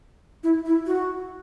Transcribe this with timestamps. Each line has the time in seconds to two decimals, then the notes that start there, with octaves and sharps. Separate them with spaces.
0.44 E4
0.65 E4
0.87 F#4